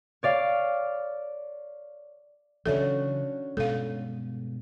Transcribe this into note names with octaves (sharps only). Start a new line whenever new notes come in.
C#5 D5 F5
C#3 E3 F#3 C#4 D4 F#4 A4 E5
G2 B2 G#3 A4 F5